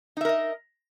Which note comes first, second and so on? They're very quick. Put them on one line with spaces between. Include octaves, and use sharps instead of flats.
D#4 E5 A#4 D#5